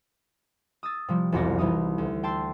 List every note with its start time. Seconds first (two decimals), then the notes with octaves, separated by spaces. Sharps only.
0.83 D#6 E6 A6
1.08 C3 F3 G3
1.32 E1 C2 F2 F#4 D5 A#6
1.58 C2 E3 D#4 D#6
1.98 D2
2.23 G5 A5 C6 E6